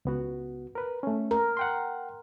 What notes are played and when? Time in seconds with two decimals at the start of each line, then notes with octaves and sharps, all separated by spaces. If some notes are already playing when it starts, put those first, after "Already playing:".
0.05 C#2 B3 F#4
0.75 A#4 B4
1.03 A3 C#4
1.31 A#4
1.57 F#5 G5 C6